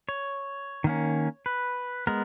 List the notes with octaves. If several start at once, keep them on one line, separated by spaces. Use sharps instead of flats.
C#5
D#3 A#3 C#4
B4
G#3 B3 A#4